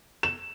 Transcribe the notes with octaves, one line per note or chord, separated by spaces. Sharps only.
E7